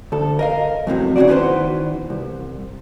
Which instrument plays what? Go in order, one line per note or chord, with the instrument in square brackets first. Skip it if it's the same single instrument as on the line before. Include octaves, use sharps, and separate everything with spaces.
[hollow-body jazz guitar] D2 A4
A#4 D#5 F5
F2 A2 C3 F#3
C#3 F#3 C4 F#4 D5
D#3 E3 B3 G#4 B4 C5
C2